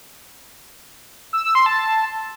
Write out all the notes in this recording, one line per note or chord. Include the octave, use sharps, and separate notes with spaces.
E6
E6
C6
A5